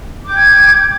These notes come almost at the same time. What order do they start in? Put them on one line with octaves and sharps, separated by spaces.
D6 G6 G5 G#6